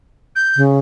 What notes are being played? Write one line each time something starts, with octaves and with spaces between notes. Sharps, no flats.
G6
C#3